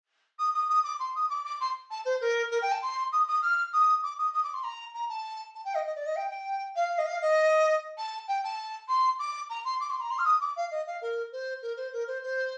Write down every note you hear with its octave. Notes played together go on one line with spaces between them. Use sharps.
D#6
D#6
D#6
D6
C6
D#6
D6
D6
C6
A5
C5
A#4
A#4
G5
A5
C6
D#6
D#6
F6
D#6
D6
D#6
D#6
D6
C6
A#5
A#5
A5
A5
G5
D#5
D#5
D5
D#5
G5
G5
F5
D#5
F5
D#5
A5
G5
A5
C6
D6
A#5
C6
D6
C6
A#5
C6
F6
D#6
D6
F5
D#5
F5
A#4
C5
A#4
C5
A#4
C5
C5